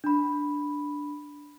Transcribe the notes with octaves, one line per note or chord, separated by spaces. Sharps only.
D4 B5